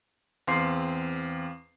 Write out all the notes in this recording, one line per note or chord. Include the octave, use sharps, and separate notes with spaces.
E2 C4 F5 C6 D6 C7